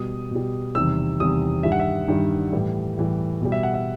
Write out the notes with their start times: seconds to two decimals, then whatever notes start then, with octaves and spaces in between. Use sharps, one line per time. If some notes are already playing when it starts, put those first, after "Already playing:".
Already playing: B2 G3 D#6
0.31 B2 G3
0.75 E2 C3 D#3 G3 E6
1.20 E2 C3 D#3 G3 D#6
1.63 G2 D#3 G3 E5
1.72 F#5
1.80 E5
2.08 G2 D#3 G3
2.52 A2 E3 G3
2.97 A2 E3 G3
3.41 B2 G3
3.52 E5
3.63 F#5
3.74 E5